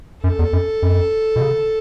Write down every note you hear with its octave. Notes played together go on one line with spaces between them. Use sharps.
F#2 A4
E2
F#2
F#2
B2
C#3